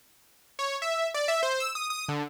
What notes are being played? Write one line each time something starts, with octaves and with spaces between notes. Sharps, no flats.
C#5
E5
D5
E5
C5
E6
D#6
D#6
D3